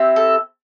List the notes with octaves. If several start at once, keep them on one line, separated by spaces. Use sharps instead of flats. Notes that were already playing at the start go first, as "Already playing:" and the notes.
Already playing: C4 E4 G4
A4